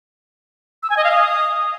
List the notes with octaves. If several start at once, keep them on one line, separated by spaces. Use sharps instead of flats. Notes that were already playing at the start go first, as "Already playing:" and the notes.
E6
G#5
D#5
F5
D#6